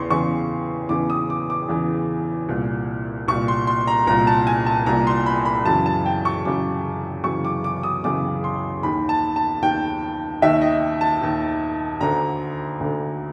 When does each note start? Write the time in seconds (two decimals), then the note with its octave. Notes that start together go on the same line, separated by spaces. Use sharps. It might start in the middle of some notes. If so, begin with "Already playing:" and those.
Already playing: E2 C#3 E3 C6 C#6
0.10 E2 C#3 E3 C#6
0.89 E2 C#3 E3 D6
1.10 D#6
1.30 D6
1.50 D6
1.69 E2 C#3 E3
2.49 C2 A#2
3.28 C2 A#2 C#6
3.48 C6
3.67 C6
3.87 A#5
4.07 C2 A#2 A#5
4.27 A5
4.47 G#5
4.66 A5
4.86 C2 A#2 A#5
5.07 C6
5.26 B5
5.45 B5
5.65 F#2 C#3 E3 A5
5.86 A5
6.06 G5
6.25 C#6
6.45 F#2 C#3 E3 D6
7.24 F#2 C#3 E3 C#6
7.45 D6
7.64 D6
7.83 D#6
8.04 F#2 C#3 E3 D6
8.44 C6
8.83 D#2 D#3 B5
9.09 A5
9.36 A5
9.62 D#2 D#3 G5
10.42 D#2 D#3 E5
10.61 D#5
11.01 A5
11.21 D#2 D#3
12.01 D2 D3 A#5
12.80 D2 D3